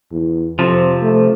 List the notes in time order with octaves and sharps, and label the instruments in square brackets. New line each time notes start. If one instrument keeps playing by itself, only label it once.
[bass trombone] E2
[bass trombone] F2 [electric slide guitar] C3 F3
[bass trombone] A3